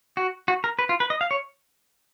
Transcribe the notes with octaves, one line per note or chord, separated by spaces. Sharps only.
F#4
F#4
A#4
B4
F4
B4
D#5
F5
C#5